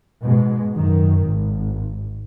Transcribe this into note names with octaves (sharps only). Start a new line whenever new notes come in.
G#2 B2 G#3
F#2 D#3
G#1